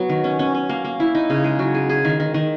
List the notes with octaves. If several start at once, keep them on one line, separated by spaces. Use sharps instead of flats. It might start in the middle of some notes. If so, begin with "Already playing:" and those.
Already playing: F#3 B3
D#3
C#4
C#4
C#4
A#3
A#3
E4
D#4
C#3
G#3
F#3
G#4
G#4
D#3
D#3
D#3